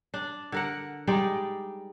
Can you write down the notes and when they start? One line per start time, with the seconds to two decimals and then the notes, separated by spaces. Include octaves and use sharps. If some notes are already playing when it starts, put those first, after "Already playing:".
0.14 D4
0.52 D3 A#4 F#5
1.07 G3 G#3 D#4 D5